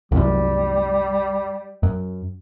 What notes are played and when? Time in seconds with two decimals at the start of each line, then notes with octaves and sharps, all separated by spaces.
0.12 C2 F#2 G3
1.83 F#2